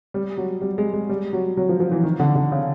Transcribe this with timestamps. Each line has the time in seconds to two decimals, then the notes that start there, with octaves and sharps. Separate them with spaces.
0.14 G3
0.37 F#3
0.62 G3
0.78 G#3
0.93 G#3
1.09 G3
1.33 F#3
1.57 F#3
1.69 F3
1.80 F3
1.92 E3
2.04 D#3
2.19 D3
2.36 D3
2.52 C#3